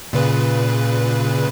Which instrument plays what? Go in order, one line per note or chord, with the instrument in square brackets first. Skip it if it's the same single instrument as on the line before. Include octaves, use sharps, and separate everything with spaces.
[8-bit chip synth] A#2 C#3 B4